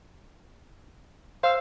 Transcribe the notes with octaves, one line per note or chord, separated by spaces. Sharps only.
C5 F5 E6